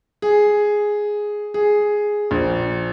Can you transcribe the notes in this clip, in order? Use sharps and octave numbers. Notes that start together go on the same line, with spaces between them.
G#4
G#4
A#1